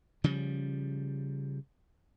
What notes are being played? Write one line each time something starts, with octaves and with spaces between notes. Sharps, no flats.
C#3 F3 G3